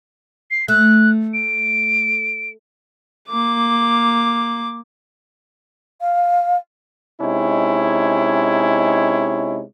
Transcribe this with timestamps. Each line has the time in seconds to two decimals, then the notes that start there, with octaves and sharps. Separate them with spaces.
0.51 C7
0.68 A3 F#6
1.34 D7
3.29 A#3 D6
6.01 F5
7.21 C3 G#3 C#4 D#4 E4